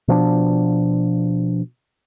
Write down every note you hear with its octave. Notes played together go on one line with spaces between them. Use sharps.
B2 F3 D4